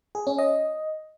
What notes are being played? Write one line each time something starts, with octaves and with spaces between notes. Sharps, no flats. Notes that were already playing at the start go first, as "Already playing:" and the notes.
G#4
C#4
D#5